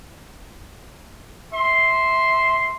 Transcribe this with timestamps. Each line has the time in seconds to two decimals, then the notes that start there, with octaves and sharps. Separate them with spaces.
1.53 E5 C6